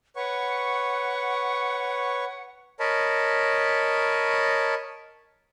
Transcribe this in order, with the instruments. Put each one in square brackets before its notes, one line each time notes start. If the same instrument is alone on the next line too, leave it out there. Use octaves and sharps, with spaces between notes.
[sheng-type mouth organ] B4 C#5 C#6 [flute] F#5
[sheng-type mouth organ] A#4 C#5 D#5 A5 B5